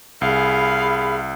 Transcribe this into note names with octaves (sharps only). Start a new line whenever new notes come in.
C2 G#4 F5 B5